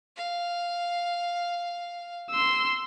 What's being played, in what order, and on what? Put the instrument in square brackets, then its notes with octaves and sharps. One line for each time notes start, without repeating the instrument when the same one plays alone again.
[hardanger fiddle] F5
[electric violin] C6 E6